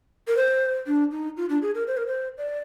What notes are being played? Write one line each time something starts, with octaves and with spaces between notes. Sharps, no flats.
A#4
C5
D4
D#4
F4
D4
G#4
A#4
C5
A#4
C5
D5